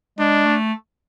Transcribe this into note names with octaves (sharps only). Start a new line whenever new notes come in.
G#3 D4
A3